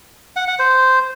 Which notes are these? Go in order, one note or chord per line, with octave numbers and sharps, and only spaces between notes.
F#5
F#5
C5